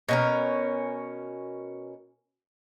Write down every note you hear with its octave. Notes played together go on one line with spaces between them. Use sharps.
B2 C#4 A#4